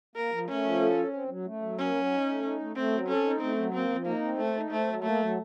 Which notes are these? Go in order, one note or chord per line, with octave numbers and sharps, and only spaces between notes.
A#3 A#4
F3
A3 C#4
F3
A4
C#4
C4
F#3
A3
F#3
A#3 C#4
F#3
D#4
A3
D#4
A3
A3 C4
F#3
C#4 A4
D#4
A3 C4
F#3
A#3 C4
F3
A#3 D#4
C4
A3 A4
D#4
A3 C4
F#3
A3 A#3
F#3